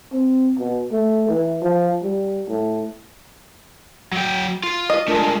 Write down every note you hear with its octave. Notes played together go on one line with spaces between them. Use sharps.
C4
B2
A3
E3
F3
G3
A2
F#3 G5
F4
D#5
G#3 A3 D4 F4 A#4